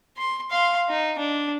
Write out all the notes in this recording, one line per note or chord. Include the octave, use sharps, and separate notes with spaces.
C6
F5 C6
D#4
D4